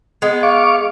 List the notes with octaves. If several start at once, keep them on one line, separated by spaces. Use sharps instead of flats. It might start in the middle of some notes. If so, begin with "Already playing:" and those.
G#3 B3
F5 C#6 D6